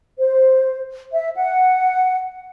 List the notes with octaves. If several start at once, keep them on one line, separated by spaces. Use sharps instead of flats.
C5
E5
F#5